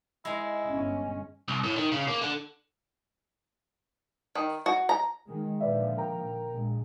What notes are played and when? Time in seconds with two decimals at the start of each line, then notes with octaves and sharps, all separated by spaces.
0.25 G#3 E4 A#5
0.66 G1 C#4
1.48 C2
1.64 A2
1.77 D#3
1.92 C#3
2.07 A#3
2.21 D3
4.35 D#3
4.66 F#4
4.89 A#5
5.27 D#3 G#3
5.60 A#2 D3 F3 B4 D5 E5
5.97 A#4 G5 A#5
6.50 A#1 A#2 G#3